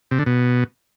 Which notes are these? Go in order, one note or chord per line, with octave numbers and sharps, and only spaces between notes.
C3
D3
B2